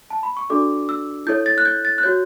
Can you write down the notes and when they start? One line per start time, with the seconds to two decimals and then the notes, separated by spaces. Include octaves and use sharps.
0.10 A5
0.23 B5
0.37 C#6
0.50 D4 F#4 A4 D5 D6
0.89 E6
1.27 E4 A4 C#5 G6
1.46 A6
1.58 F#6
1.65 G6
1.85 A6
1.98 F#6
2.03 F#4 C#5 G6